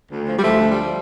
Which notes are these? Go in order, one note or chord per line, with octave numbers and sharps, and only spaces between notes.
D2
F3
G3
D2 F3 A3
F3
G3